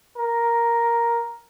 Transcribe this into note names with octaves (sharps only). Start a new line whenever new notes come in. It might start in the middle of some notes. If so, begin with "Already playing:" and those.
A#4